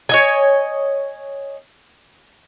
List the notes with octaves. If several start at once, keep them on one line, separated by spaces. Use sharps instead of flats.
C#5 D#5 G#5